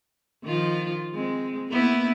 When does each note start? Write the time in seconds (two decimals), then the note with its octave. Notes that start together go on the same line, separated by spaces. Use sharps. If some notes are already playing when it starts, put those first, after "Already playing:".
0.44 D#3 F3 F4
1.14 G#3 C4
1.69 A#3 B3 E4